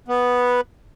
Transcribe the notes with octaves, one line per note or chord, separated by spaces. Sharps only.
B3